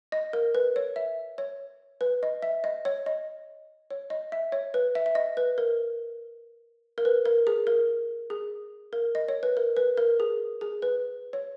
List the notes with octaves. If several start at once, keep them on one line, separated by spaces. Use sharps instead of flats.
D#5
A#4
B4
C#5
E5
C#5
B4
D#5
E5
D#5
C#5
D#5
C#5
D#5
E5
C#5
B4
E5
E5
D#5
B4
A#4
A#4
B4
A#4
G#4
A#4
G#4
A#4
D#5
C#5
B4
A#4
B4
A#4
G#4
G#4
B4
C#5